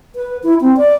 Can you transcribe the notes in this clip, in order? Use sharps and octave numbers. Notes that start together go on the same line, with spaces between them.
B4
E4
C4
D5